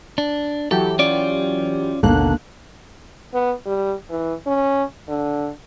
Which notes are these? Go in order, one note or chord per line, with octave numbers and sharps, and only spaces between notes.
D4
E3 F#3 G4 A4
C#4 F4 D5
A1 D#2 B2 D3 A#3 F#6
B3
G3
E3
C#4
D3